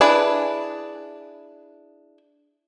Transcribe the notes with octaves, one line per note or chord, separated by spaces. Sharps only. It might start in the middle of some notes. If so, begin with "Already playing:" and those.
D4 E4 G#4 B4